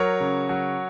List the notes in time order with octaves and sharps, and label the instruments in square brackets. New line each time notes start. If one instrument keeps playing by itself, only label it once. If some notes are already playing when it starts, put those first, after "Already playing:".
Already playing: [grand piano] F#3 A#4 C#5
C#3
F#3